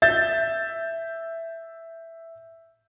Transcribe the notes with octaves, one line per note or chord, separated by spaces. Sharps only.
E5 G6 A6